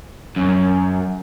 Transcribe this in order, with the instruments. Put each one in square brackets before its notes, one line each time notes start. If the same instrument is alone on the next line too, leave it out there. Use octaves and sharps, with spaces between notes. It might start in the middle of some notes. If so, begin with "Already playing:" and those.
[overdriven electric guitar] F#2